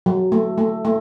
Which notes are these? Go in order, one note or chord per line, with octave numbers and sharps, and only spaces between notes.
F#3
A3
A3
A3